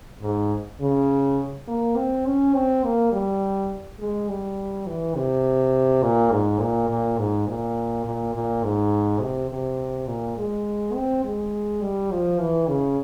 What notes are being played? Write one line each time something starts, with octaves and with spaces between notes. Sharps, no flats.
G#2
C#3
A#3
C4
C#4
C4
A#3
G3
G#3
G3
E3
C3
A#2
G#2
A#2
A#2
G#2
A#2
A#2
A#2
G#2
C3
C3
A#2
G#3
C4
G#3
G3
F3
E3
C#3